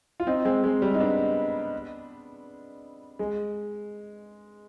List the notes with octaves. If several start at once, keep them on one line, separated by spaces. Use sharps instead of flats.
F4
C4 D#4
G#3 C4
G#3
G3
D#4
B3 D4
G#3